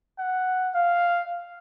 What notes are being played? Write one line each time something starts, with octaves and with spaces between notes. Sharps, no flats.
F#5
F5